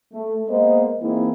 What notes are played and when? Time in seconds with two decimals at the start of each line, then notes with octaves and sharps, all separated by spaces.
0.13 A3
0.48 G#3 A#3 B3 C5 D#5
1.00 E3 G#3 A#3 C4 D#4 E4